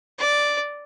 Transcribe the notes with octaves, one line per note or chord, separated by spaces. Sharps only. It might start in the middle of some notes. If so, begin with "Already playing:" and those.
D5